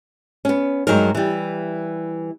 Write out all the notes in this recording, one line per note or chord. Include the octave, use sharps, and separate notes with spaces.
B3 C#4
G2 F#3 G#3 D#4 A#4
E3 G3